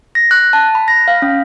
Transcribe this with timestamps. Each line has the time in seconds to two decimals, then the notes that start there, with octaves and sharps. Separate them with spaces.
0.15 A#6
0.31 F#6
0.53 A5
0.75 B5
0.88 A#6
1.08 F5
1.22 C#4